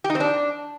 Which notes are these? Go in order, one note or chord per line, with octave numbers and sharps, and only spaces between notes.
G4
D#4
C4
D4